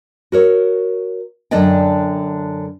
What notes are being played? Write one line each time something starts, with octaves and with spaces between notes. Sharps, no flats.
F#4 A#4 C#5
F#2 D3 D4 D5 D#5 G5